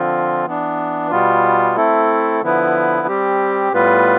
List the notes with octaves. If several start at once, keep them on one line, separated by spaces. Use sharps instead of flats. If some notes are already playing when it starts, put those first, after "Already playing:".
Already playing: D3 F3 C4 F4
E3 B3 D4
B2 G3 B3 F4
A3 C4 E4 A4
D3 F3 B3 E4 B4
G3 C4 G4
A2 G3 B3 F4 B4